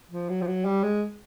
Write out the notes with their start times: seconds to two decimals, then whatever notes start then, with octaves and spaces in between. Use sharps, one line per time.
0.11 F3
0.29 F#3
0.42 F3
0.47 F#3
0.65 G3
0.84 G#3